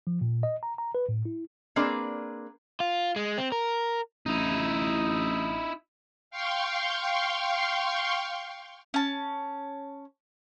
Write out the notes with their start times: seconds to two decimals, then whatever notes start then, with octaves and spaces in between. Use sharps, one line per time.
0.07 F3
0.21 A#2
0.43 D#5
0.63 A#5
0.78 A#5
0.95 B4
1.09 A2
1.25 E4
1.76 A#3 C4 D4 G#4 B4 D5
2.80 F4
3.16 G#3
3.38 C4
3.52 A#4
4.26 A1 D#4 E4
6.31 F5 G5 C6 C#6
8.94 C#4 A5